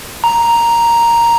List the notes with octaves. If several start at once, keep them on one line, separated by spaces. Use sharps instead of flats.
A#5